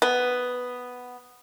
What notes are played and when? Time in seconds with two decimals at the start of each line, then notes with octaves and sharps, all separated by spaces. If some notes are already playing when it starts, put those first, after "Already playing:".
0.02 B3